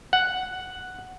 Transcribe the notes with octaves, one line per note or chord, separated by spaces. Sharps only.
F#5